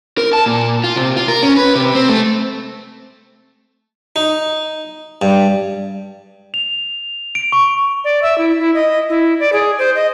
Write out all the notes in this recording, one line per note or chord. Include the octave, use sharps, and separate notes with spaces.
A#4
A5
A#2
F4
C3
F4
A#4
C#4
B4
C3
C4
A3
D#4
G2
F7
D7
C#6
D5
E5
E4
E4
D#5
E4
D5
G#4
C5
D#5